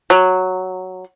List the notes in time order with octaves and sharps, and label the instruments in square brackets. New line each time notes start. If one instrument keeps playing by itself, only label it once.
[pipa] F#3